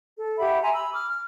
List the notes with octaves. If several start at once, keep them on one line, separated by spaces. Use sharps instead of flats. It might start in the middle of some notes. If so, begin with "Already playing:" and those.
A4
G4 E5 F#5 B5
E5 G#5 A#5 C6
B5 E6
D6 F6
F6